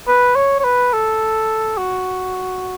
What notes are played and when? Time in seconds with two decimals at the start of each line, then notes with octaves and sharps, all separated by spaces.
0.07 B4
0.36 C#5
0.60 C#5
0.64 B4
0.93 A4
1.78 F#4